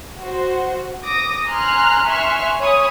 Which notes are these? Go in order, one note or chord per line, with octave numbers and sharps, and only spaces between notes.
F#4 C5
D6 D#6 A#6
G#5 A#5 C6 F6 F#6
E5 G#5 C6 C#6 F6 F#6
C#5 G#5 B5 C#6 D#6